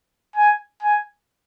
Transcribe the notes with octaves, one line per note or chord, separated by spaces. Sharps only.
G#5
G#5